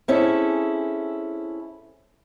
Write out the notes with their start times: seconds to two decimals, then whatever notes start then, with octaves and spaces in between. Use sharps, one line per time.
0.08 C4 C#4 E4 G#4 A4